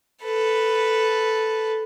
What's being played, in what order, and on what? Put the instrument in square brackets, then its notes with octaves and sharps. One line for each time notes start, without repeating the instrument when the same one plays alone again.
[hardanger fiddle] A4 B4